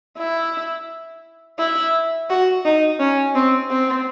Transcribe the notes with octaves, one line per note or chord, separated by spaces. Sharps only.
E4
E4
F#4
D#4
C#4
C4
C4